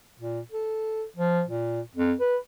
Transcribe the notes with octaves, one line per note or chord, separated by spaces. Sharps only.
A#2
A4
F3
A#2
F2
B4